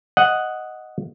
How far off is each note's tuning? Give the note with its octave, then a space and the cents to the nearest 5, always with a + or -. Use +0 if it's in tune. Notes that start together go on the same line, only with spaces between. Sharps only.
D#5 +0 F#5 +0